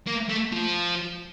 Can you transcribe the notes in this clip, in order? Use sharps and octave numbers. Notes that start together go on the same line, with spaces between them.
A#3
A3
F3